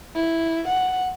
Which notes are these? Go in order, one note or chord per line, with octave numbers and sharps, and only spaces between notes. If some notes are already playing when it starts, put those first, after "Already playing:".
E4
F#5